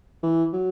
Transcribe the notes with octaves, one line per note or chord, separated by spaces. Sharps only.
E3
F#3